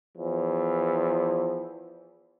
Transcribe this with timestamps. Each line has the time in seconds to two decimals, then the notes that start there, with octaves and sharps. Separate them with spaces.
0.17 E2 F3